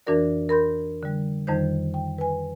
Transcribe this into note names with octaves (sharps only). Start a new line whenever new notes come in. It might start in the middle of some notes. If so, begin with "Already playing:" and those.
F2 E3 D4 F#4 A#4 D5
A#4 B5 C6 G6
D3 G3
F2 D#3 G3 D#4 C5 G6
G5
B4 G#5